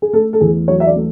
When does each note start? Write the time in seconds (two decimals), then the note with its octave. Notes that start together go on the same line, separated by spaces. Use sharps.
0.02 G#4
0.13 A3 A4
0.33 A4
0.41 E2 G#4
0.68 F#3 C#5
0.80 E5
0.87 D5
0.96 A3